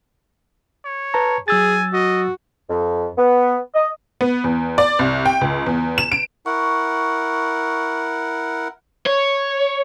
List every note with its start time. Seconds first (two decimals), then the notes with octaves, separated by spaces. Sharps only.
0.85 C#5
1.14 B4 A5 A#5
1.48 F#3 G#4 G#5 E6 A6
1.93 F#4 D#5
2.69 F2
3.17 B3
3.74 D#5
4.21 B3
4.44 E2
4.78 D5
4.99 C2
5.26 G5
5.41 C#2
5.66 E2
5.98 E7
6.12 D7
6.46 E4 A#4 F#5 C#6
9.07 C#5